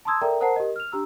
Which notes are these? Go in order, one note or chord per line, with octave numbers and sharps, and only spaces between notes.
A5 A#5 C6 D#6 E6 G#6
A4 A#4 D5 E5 G5 A#5
A#4 C5 F#5 A5 A#5 C7
G4 A#4 D#5
F6 F7
D4 G4 A#5 E6